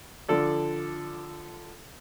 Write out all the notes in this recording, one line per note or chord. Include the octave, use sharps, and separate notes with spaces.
D3 F3 A4 D5